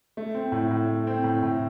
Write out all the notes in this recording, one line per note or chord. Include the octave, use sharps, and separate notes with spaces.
A3
C4
A2
A2
A3
C4
A2
A2